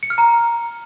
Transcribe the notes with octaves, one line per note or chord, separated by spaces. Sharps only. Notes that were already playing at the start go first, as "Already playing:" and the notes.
C#7
F6
A#5